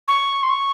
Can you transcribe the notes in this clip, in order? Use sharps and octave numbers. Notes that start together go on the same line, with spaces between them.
C#6
C6
C#6